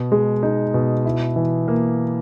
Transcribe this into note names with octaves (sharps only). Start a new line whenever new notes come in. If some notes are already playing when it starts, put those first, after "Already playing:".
Already playing: B2
G#3
D#4
B2
E4
E3
A#3